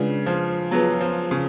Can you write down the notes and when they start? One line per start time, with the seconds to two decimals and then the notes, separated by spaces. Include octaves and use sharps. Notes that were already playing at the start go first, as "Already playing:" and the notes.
Already playing: C#3 G#3 D4 F4 B4 D5
0.26 F3
0.71 F#3 B3 F4 G#4 B4
1.01 F3
1.31 C#3